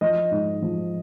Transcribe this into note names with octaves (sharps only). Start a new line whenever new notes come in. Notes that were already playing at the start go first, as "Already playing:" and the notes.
F3 D#5
G#2
F3